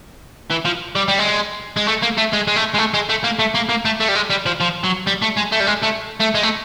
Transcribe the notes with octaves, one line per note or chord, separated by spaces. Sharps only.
E3
F3
G3
G3
G#3
G#3
A3
A#3
A3
G#3
G#3
A3
G#3
A3
G#3
A3
A#3
A3
A#3
A#3
A3
A3
G3
G#3
G3
F3
F3
F#3
G3
A3
G#3
A3
G3
G#3
A3
A3
G#3
A3